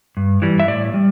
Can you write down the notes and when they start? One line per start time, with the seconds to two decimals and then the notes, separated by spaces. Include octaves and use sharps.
0.17 G2
0.42 E3 G3
0.60 E5
0.68 A2 D5
0.94 G3